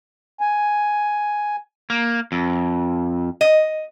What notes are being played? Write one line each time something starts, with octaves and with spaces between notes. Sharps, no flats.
G#5
A#3
F2
D#5